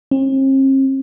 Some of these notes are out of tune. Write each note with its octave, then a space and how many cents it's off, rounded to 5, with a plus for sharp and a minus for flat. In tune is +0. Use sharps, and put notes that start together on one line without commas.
C4 +45